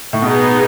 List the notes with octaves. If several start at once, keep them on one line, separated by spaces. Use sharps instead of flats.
A2
B2 B3 D#4 G#4